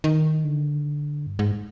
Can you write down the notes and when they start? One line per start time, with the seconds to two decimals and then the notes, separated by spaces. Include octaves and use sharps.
0.04 D#3
0.44 D3
1.27 G2
1.39 G#2